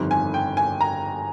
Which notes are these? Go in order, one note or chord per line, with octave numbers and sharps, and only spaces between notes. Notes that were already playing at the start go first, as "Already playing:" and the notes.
Already playing: G1 F2 D#3 G3
G#5
G5
G#5
A#5